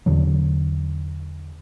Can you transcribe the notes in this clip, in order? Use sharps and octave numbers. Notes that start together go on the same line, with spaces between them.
E2 D3 F#3